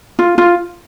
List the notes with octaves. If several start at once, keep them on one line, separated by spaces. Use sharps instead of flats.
F4
F4